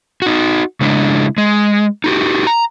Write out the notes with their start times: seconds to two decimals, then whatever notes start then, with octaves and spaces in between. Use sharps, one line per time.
0.22 D#4 F#4
0.81 C#3 G#3 D4 E4
1.38 G#3
2.04 D#4 F#4 G4
2.47 A#5